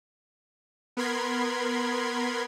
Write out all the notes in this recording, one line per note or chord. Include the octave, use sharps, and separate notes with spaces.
B3 A#4 B5 C6 G#6